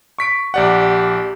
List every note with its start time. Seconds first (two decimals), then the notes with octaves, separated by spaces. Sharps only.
0.19 C#6 B6 D7
0.54 A#1 G4 D5 F#5